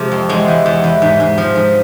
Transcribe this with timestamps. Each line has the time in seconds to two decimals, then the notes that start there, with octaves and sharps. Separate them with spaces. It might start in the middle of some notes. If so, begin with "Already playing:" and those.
Already playing: C3 F3 G#3
0.12 F2
0.29 E2 G#3
0.48 E2
0.66 E2
0.84 E2
1.02 G#2
1.20 G#2
1.38 F3
1.56 G#2